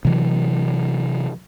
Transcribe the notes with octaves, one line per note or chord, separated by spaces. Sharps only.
C3 E3 F#3